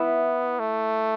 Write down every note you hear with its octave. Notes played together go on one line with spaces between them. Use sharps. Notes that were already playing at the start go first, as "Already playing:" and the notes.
Already playing: B3 E4
A3